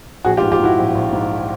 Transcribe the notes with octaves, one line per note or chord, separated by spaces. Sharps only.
A#1 F#4 G#4
F4 G4
G#2
F4 G4
G#2 E4 F#4
A#1
A#1
G#2